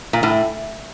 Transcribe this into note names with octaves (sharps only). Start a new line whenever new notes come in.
A#2
A2